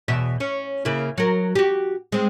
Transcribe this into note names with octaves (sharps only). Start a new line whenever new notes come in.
E2 B2 E5
C#4
C#3 A#3 E4
F#3 A#4
F#4 G4
G#3 C4